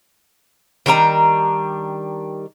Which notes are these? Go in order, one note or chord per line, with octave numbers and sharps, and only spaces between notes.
D#3 G3 D4 A#5